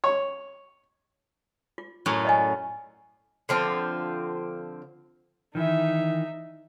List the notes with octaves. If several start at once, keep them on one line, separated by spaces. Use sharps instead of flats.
C#5
F4
F#2 A2 C#4
D5 D#5 G#5
D3 F3 C4
D#3 E3 D#4 E5